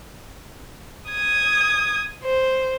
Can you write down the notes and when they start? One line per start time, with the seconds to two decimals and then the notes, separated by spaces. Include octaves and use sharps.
1.11 D#6 G#6
2.24 C5